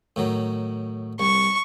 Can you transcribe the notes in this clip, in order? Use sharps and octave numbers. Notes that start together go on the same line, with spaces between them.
A2 D#3 F#3
C2 C#6